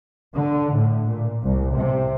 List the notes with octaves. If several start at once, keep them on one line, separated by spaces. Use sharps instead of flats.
D3
A2
A#2
C2
C3